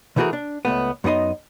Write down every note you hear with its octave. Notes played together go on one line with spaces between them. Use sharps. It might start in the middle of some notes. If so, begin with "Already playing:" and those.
C3 E3 A3 F#4 G#4 A#4
D4
C#2 A3 B3
F#2 B3 D#4 D#5 C6